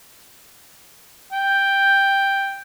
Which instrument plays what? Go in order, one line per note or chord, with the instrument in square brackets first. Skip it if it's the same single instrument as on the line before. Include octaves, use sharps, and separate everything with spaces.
[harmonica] G5